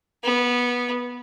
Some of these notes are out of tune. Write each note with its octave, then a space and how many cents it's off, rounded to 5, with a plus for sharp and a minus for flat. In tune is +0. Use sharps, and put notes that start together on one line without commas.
B3 -15